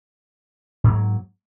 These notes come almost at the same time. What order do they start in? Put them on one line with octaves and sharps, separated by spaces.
G#2 A#3 F#3